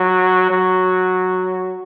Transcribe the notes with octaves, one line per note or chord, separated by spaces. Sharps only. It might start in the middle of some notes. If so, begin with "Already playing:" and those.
Already playing: F#3
F#3